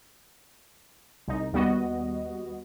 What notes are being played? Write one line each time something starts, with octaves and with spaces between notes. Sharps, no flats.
C2 D#4
D#2 G3 B3 F#4 D#5